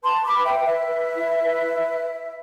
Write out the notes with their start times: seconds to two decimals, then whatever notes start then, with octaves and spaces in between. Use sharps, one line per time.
0.04 B4 A5 C6
0.24 B5 D6
0.32 B4
0.46 E5 G5
0.59 B4
0.67 E5
0.87 B4
1.15 E4
1.43 B4